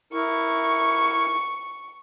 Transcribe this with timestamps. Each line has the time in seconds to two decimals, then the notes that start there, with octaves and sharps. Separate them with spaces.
0.13 E4 A#4 C#6